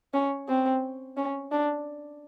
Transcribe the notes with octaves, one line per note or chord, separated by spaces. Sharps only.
C#4
C4
C#4
D4